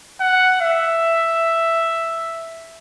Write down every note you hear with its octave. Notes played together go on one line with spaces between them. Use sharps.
F#5
E5